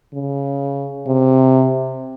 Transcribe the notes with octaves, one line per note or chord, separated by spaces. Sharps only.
C#3
C3